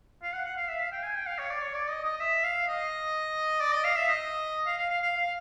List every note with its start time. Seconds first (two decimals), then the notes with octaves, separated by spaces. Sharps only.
0.23 F5
0.33 F#5
0.45 F#5
0.56 F5
0.69 E5
0.80 F5
0.92 G5
1.03 G#5
1.16 G5
1.27 F5
1.38 C#5
1.50 D5
1.62 C#5
1.74 D5
1.89 D#5
2.05 D#5
2.20 E5
2.44 F5
2.68 D#5
3.61 D5
3.73 D#5
3.84 F5
3.96 E5
4.08 D#5
4.66 F5
4.78 F5
4.89 F5
5.02 F5
5.17 F5